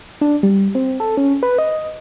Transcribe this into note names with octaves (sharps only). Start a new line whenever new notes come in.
D4
G3
C4
A4
C#4
B4
D#5